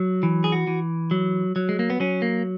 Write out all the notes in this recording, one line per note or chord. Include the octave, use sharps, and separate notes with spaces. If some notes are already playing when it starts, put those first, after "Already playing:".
Already playing: F#3
E3
G#4
F#4
E3
F#3
F#3
G#3
A#3
B3
F#3 C#4
A#3